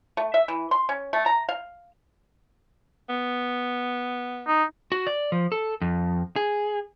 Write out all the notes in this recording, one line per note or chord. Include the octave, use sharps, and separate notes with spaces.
A3
E5
E3
C6
C#4
A3
A#5
F5
B3
D#4
F#4
D5
F3
A4
F2
G#4